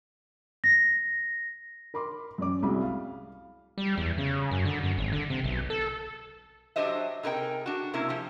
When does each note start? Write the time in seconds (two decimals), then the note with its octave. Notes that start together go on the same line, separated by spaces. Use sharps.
0.64 A#6
1.94 A#4 B5 C6 D6
2.38 F#2 C#4 D5 D6
2.63 C2 F#4 G#4 B5
2.82 F5
3.78 G3
3.98 E2
4.18 C#3
4.51 F#2
4.65 D3
4.83 F#2
4.97 G#1
5.13 D3
5.30 C3
5.44 B1
5.70 A4
6.76 F#3 D4 G4 C5 D#5 E5
7.23 C3 D#4 G#4 A#4 C#5 G5
7.66 D4 F#4
7.93 C3 A#3 C#4 E4
8.09 F3 G4